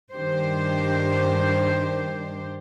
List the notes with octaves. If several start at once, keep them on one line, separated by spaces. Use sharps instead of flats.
G2 D#3 D4 G4 C5